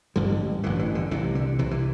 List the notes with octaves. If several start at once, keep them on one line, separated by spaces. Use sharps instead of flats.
A1 G2 D3 G3
A1 G2 D3 E3
E3
D3
C2 C3 E3
D3
C2 C3 E3
E3